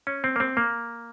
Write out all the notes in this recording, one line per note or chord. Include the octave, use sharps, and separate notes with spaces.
C#4
C4
A#3
C4
A#3